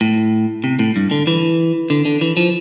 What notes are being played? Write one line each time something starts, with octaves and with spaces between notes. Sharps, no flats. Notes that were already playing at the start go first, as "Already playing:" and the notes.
A2
C3
A2
G2
D3
E3
D3
D3
E3
F3